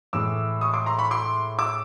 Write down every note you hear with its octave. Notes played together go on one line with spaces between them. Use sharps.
A2 E3 G#3 D6 E6
C#6 D#6
C6 D6
A#5 C6
B5 C#6
C6 D6
D6 E6